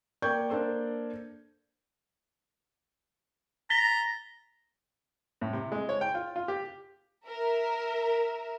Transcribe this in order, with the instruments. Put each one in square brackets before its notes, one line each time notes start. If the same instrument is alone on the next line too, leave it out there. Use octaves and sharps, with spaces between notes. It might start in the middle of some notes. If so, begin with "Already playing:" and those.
[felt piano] A#3 D5 G5 C#6 G6 G#6
A#3 D4 A4 C5
[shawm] A#5 [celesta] A6 B6 G7
[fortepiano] A2
C3
G#3
C#5
G5
F4
F4
G4
[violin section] A#4 E5